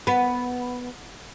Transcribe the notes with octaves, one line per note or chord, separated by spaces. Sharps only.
B3